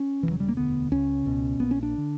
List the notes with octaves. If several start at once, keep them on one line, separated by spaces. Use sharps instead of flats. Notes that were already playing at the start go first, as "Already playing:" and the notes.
Already playing: C#4
E1 D2 C#3 E3
F#3
G3
A#3
E1 D2 D3 B3
C#2 C#3 C#4
C#2 B2
A#1 A#2 B3
C#4
D4
D3